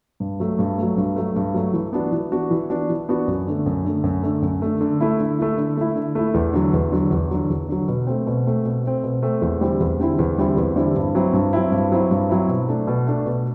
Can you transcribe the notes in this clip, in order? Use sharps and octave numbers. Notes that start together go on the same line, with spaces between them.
G2
F#3 A3
G2
F#3 A3
G2
F#3 A3
G2
F#3 A3
E3
B3 D4 F#4
E3
B3 D4 F#4
E3
B3 D4 F#4
E3
B3 D4 F#4
F#2
D3 A3
F#2
D3 A3
F#2
D3 A3
F#2
D3 A3
D3
A3 E4
D3
A3 E4
D3
A3 E4
D3
A3 E4
E2
D3 F#3
E2
D3 F#3
E2
D3 F#3
E2
D3 F#3
B2
A3 C4
B2
A3 C4
B2
A3 C4
B2
A3 C4
E2
D3 G3 C4 E4
E2
D3 G3 C4 E4
E2
D3 G3 C4 E4
E2
D3 G3 C4 E4
G2
F#3 C4 E4
G2
F#3 C4 E4
G2
F#3 C4 E4
G2
F#3 C4 E4
B2
A3 D4
B2
A3 D4
B2